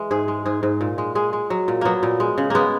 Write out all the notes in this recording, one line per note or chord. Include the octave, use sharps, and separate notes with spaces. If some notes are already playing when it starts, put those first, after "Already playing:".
Already playing: E3 G#3
G#2 G#4
G#3
G#2 G#4
G#2
A#2
G#3
G#3 G#4
G#3
F#3
A#2
F#3 A#3 B3
A#2
G#3
C#3
G#3 A#3 B3